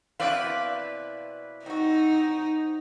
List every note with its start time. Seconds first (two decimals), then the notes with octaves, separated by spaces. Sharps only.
0.20 B2 C4 E4 B4 D5 F5
1.66 C4 D#4 F#4